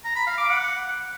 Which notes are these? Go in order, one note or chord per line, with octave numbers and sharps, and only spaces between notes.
A#5
B5
F5
D6
F#5